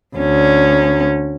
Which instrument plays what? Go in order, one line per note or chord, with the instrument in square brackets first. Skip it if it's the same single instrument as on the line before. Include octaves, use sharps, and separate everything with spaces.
[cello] D2 C#4